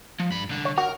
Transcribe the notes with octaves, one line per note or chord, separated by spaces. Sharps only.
F3
G2 B5
C2 D3
C#5
F#4 A#4